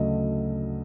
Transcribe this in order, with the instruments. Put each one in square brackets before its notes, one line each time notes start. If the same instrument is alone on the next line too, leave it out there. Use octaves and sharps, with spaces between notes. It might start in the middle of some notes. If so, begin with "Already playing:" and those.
Already playing: [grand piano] D2 C#3 F#3 A3 D#5